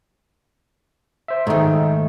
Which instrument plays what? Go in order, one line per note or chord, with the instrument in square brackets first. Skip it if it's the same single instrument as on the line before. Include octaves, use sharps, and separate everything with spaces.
[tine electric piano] C5 E5
[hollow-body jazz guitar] G#2 D#3 [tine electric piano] A3 D#4